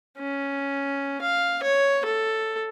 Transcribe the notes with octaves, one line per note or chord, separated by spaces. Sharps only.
C#4
F5
C#5
A4